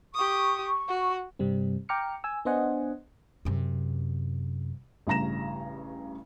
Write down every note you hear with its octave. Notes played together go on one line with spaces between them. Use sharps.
G4 C#6 D#6
F#4
G2 C3 G3 C4
G5 A#5 D6 F6 C#7
G#5 E6
B3 D4 C5 D#5 F#5 G#5
F#2 C3
A1 G2 C#3 A#5 A#6 E7